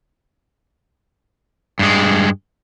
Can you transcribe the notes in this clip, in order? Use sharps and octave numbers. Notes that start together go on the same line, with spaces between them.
G2 G#3